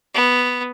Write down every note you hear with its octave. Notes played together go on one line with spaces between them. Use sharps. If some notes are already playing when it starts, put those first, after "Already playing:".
B3